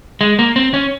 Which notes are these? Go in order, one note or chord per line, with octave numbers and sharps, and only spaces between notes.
G#3
A#3
C4
C#4